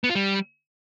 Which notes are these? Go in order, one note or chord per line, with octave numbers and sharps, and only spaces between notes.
B3
F4
G3